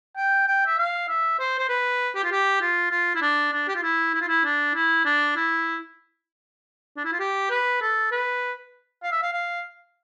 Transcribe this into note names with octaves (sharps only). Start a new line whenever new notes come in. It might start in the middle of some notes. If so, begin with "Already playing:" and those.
G5
G5
E5
F5
E5
C5
C5
B4
G4
F4
G4
F4
F4
E4
D4
D4
G4
F4
E4
E4
F4
E4
D4
E4
D4
E4
D4
E4
F4
G4
B4
A4
B4
F5
E5
F5
F5